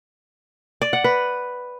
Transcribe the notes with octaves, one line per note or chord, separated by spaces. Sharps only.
D5
F#5
B4